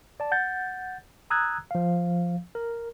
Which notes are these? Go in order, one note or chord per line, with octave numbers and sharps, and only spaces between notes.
D5 A5
F#5 G6 A6
A#5 D#6 E6 F#6 G#6
F3 F5
A#4